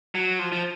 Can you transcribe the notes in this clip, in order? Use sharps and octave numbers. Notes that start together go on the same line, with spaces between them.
F#3
F3
F3